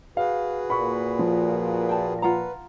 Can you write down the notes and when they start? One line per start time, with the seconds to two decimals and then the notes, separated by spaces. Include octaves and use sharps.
0.17 F#4 G#4 B4 F5
0.70 A#2 B5 C#6
1.19 F3
1.89 G5 A5
2.22 F4 B4 F#5 A#5